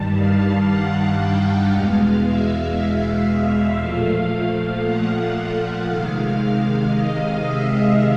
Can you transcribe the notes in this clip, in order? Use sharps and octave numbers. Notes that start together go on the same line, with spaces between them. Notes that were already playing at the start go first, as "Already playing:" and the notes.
Already playing: G2 D#3 G3 A5
F5
F#5
G5
E2 B2 G#3 F5
E5
E5
A#2 F3 A3 F5
F#5
C3 D#3 G#3 F5
D#5
E5